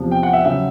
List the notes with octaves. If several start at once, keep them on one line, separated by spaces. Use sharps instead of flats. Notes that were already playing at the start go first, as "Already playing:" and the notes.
Already playing: E2 C3 F3
G5
F#5
E5
C#3 F#3 E5